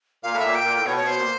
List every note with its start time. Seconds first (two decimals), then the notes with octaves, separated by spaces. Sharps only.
0.23 A#2 F5
0.34 A2
0.39 A#2 E5
0.55 G5
0.65 A#2
0.76 A2
0.85 B2 C#5
0.97 B2 C#5
1.07 C5
1.18 A#2